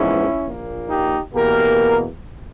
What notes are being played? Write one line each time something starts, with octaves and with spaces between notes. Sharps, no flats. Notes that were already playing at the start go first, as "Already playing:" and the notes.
Already playing: A#1 G#2 E3 G#3 B3 C#4 E4
A#1 A#2 A#3
D#4 G4
E2 B2 A#3 G4 A#4